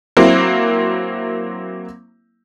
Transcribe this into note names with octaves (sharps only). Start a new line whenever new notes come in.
F#3 A#3 C4 E4